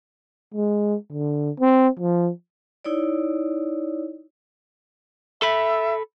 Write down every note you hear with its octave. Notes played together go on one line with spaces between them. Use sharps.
G#3
D3
C4
F3
D#4 E4 C#5 D5
A4 E5 B5